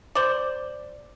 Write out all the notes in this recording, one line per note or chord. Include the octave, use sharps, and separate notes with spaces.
C5 D5